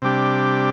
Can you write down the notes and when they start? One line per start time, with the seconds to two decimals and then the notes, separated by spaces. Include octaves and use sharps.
0.02 C3 G3 D4 G4